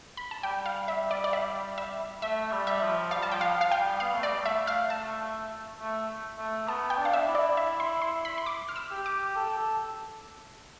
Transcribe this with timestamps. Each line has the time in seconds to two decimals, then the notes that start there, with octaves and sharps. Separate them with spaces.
0.17 B5
0.31 A5
0.43 G3 G5
0.66 F5
0.88 E5
1.11 D5
1.24 D5
1.33 E5
1.78 E5
2.22 A3 E5
2.52 G3
2.67 E5
2.82 F3
3.11 G3 F5
3.22 A5
3.31 F3 G5
3.41 F5
3.61 F5
3.71 G5
3.78 G3
4.00 B3 F5
4.14 A3
4.23 G3 D5
4.40 A3
4.45 E5
4.67 F5
4.90 A5
5.79 A3
6.38 A3
6.68 B3 A5
6.90 G5
6.97 D4
7.05 F5
7.13 E5
7.28 E4
7.35 D5
7.57 E5
7.80 C6
8.02 C6
8.25 B5
8.38 C6
8.46 D6
8.69 F6
8.76 E6
8.91 G4
9.06 D6
9.36 A4
9.58 A4